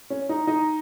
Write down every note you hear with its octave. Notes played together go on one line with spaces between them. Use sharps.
C#4
D#4
D#4